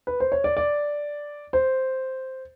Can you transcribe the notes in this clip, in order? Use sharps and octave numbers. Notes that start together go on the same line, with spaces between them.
B4
C5
C#5
D5
D5
C5